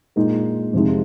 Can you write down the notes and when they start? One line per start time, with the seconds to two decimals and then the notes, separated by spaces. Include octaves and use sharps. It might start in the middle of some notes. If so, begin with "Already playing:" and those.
0.16 A#2 G#3 D#4 A#4
0.73 F2 C3 F3 G#3 D#4